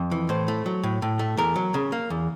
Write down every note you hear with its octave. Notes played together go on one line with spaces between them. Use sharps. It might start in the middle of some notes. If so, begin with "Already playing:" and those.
Already playing: F2
E3
A2 C5
A3
F#3
A2
A2
A3
E2 A#4
F#3
C#3
A#3
E2